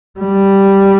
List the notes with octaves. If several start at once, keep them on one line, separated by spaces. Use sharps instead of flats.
G3